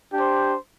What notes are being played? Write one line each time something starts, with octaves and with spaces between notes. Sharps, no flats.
D4 G4 C5